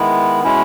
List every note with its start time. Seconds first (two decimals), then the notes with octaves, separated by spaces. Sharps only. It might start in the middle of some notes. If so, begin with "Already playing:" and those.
Already playing: D#3 G#3 B3 E4
0.44 B2 G#3 C#4 E4